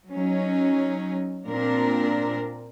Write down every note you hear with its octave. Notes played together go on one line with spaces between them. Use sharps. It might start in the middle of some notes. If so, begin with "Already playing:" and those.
F#3 C#4 D#4
A#2 C4 D4 A#4